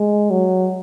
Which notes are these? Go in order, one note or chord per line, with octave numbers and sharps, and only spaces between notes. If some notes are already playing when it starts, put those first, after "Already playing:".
Already playing: G#3
F#3